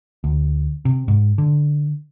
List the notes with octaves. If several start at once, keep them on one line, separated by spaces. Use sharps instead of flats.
D2
C3
G#2
D3